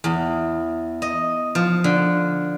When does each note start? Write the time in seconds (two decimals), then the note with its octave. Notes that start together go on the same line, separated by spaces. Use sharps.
0.04 E2
1.02 D#5
1.55 F3
1.84 D3